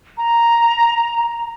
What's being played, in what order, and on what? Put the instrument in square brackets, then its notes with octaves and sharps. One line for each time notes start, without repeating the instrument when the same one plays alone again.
[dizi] A#5